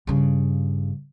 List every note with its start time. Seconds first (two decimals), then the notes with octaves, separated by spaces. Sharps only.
0.07 G2 C#3